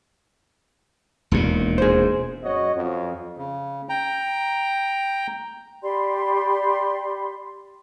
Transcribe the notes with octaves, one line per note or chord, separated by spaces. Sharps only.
E1 D#2 A#2
G#4 C5
F#2 F#4 C#5 D#5
F2
C#3
G5 A#5
G4 D5 B5 C6